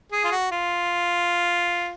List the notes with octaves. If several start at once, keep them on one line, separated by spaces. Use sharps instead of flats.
G#4
F4
F#4
F4